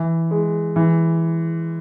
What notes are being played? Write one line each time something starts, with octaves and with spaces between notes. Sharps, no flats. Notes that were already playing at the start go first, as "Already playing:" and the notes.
Already playing: E3
G#3
E3